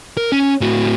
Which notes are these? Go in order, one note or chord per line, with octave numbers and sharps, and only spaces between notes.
A#4
C#4
A2 F#4